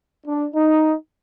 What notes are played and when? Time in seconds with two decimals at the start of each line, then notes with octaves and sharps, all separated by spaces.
0.26 D4
0.55 D#4